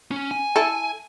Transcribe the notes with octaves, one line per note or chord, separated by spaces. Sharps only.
C#4
G#5
E4 A4